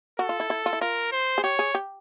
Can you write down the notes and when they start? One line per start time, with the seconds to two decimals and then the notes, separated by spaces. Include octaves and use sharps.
0.19 F#4 A4
0.29 F4
0.40 E4
0.50 E4
0.66 F4
0.73 E4
0.81 F4 A#4
1.12 C5
1.38 G#4
1.43 G4 C#5
1.59 G#4
1.75 G4